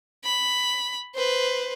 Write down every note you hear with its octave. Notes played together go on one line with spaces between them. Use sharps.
B5
B4 C5